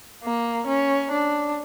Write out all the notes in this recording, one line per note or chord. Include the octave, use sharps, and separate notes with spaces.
A#3
C#4
D4